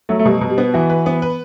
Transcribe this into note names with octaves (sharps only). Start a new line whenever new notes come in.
F#3 A3
A3
B2 G3
B2
G3
B3
E3 F#4
B4
B3
B4